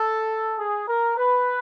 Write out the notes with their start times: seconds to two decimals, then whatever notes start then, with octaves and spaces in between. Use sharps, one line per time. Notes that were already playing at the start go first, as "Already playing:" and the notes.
Already playing: A4
0.57 G#4
0.87 A#4
1.17 B4